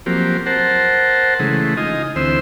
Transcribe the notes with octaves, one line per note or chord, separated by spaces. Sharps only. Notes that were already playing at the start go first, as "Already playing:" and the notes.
F3 F#3 A#3 C4 G4
A#4 C5 F#5 A5
C#3 E3 G#3 A3
D#4 F4 D#5 G#5
D2 E3 C4 C5 E6